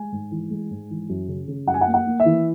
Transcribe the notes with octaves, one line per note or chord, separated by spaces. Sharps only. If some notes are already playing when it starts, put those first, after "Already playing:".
Already playing: G#3 G#5
G#2
E3
G#3
G#2
E3
F#2
C#3
C#3
F#2 F#5
G#5
F#5
A#3
F#5
A#3
E5
E3